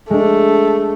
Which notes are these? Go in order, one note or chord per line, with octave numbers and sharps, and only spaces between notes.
G#3 A3 D4